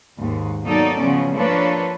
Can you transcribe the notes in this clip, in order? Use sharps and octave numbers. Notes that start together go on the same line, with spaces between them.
D#2 G#2
B2 F#3 A#3 D#4 A4 D5
C#3 F3 F#3 B3 C#4
F3 A#3 D4 A4 B4 C#5